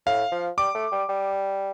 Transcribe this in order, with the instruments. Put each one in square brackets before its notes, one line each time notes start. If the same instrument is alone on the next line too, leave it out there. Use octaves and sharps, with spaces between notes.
[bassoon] A2 [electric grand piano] F5
[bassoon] F3
[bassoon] G3 [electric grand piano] D6
[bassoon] A3
G3
G3